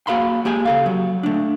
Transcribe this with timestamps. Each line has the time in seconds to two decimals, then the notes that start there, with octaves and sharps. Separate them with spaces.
0.07 A#3 F#4 G#4 F5 B5 C6
0.45 A#3 G4 G#4 G#5
0.65 C#3 A4 F5
0.86 F#3
1.23 A3 D4